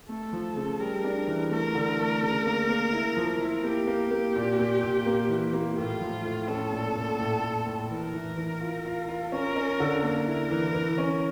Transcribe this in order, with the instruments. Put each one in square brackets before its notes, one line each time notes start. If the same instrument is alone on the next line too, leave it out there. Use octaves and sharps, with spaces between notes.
[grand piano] A3 [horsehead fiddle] A4
[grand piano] F3
C#3
[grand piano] G3 [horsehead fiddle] A#4
[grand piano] D4
E3
[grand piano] A3 [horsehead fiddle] A#4
[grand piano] D3
A3
C#3
A#3
A#3
E4
F3
E4
[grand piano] A#3 [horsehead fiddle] G4
[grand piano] A#3
A#3
A#2
A#2
A#2
A#3
E3
A#3
[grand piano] A2 [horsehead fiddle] F4
[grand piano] F3
A2
[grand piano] C#4 [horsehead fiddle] A4
[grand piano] A#2
A#2
A2
A2
A2
[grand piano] E3 [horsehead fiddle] A#4
[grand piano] E3
E3
F4
F4
F4
[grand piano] C#4 [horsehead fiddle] A#4
[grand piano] C#4
D3
[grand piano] A#3 [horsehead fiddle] A#4
[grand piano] E4
E3
E3
C#4